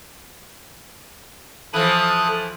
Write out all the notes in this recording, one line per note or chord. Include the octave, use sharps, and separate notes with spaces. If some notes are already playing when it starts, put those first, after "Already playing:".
E3 F3 A4 D#6 F#6